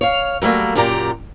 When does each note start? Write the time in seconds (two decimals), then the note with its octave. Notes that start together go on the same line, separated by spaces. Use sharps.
0.01 C#5 F5
0.42 F#3 G3 A3 A#3
0.75 F#2 A#2 G4 D5 A#5